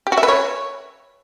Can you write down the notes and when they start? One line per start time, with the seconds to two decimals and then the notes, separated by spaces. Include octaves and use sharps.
0.07 G4
0.12 F#4
0.18 E5
0.23 B4
0.28 C#5